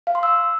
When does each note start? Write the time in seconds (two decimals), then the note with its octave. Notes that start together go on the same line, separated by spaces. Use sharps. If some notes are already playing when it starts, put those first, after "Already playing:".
0.07 F5
0.15 C6
0.23 E6